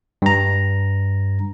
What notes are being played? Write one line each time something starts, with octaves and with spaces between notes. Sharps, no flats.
G2 A#5